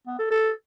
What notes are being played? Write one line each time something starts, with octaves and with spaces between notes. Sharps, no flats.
B3
A4
A4